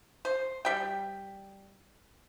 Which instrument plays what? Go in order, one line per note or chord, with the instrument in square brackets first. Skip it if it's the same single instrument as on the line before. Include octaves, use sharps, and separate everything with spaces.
[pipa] C5
G3 G5